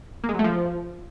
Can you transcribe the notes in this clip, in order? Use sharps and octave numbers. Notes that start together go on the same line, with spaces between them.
A#3
G#3
F#3
A3
F3